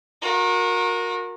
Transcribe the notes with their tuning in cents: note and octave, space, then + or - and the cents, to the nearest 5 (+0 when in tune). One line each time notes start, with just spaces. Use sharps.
F#4 -40 A#4 +0